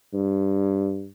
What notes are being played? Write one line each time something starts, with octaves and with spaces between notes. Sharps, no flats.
G2